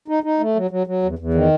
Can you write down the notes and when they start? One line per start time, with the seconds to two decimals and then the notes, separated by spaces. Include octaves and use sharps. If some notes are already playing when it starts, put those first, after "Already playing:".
0.08 D#4
0.23 D#4
0.39 A3
0.55 F#3
0.71 F#3
0.87 F#3
1.03 E2
1.19 E2
1.34 D#3